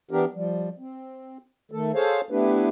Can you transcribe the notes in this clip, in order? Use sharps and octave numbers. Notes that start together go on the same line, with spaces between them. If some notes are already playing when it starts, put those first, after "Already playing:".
E3 B3 D4 G4 A#4
F3 G3
C4
D#3 A3 A4
G#4 A4 C5 C#5 F5
A3 B3 D4 E4 G4 B4